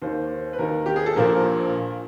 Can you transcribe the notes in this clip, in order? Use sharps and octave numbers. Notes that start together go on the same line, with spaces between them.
D#2 D#3 C5
B4
D#2 D#3 A#4
G4
G#4
A4
A#1 A#2 F3 A#4